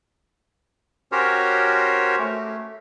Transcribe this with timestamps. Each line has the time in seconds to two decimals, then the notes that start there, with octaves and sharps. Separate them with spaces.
1.12 C#4 F#4 G4 A#4 C5 C#5
2.19 A3